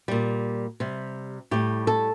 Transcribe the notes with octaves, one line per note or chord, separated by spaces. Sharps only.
A#2 G3
C3 G3
A2 G3 G4
A4